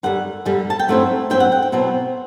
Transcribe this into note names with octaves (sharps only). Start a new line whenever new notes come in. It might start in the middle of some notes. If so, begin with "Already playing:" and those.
F#2 D3 G3 F#5
F#2 D3 G3
A5
G5
G2 F#3 A3 C4 E4 F#5
G2 F#3 A3 C4 E4 G5
F#5
G5
G5
B2 F#3 C4 E4 F#5